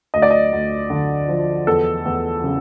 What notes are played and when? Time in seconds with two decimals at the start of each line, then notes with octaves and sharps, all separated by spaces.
0.14 D2 D#5
0.22 D5
0.31 D#5
0.52 D2
0.90 D3
1.29 F3
1.67 E2 A4
2.05 E2
2.44 C#3